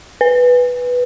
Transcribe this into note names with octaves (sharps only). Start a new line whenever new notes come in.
B4